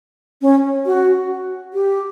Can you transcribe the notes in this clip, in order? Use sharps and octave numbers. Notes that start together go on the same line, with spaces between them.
C#4
F#4
G4